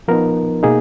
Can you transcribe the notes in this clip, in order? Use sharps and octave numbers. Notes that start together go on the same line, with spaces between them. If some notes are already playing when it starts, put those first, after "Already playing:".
F3 B3 D#4 A#4
B2 A#3 D#4 G#4